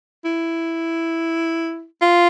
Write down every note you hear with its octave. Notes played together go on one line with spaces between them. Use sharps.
E4
F4